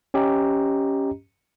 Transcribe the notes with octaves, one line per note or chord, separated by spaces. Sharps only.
C#4 G4 D#5 A#5